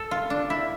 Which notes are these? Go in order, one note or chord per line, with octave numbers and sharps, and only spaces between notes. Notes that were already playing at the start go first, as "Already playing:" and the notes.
Already playing: A4
F4
D4
E4